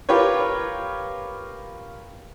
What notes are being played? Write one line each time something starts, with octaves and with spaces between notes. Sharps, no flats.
F4 G4 A#4 B4 C#5